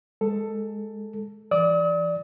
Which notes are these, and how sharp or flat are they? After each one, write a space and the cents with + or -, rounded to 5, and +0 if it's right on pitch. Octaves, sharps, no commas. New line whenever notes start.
G#3 +0 A4 +10
E3 +40 D5 +0 D#6 +45